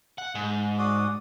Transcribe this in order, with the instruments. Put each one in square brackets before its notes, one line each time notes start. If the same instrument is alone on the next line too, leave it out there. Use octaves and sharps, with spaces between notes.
[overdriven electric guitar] F#5
G#2
[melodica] F#4 D5 D#6